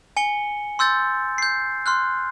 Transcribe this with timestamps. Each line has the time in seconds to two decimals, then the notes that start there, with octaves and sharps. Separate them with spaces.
0.17 G#5 C#7 G7
0.79 C6 E6 G6 A6
1.38 G6 C7
1.86 C6 F6 F#6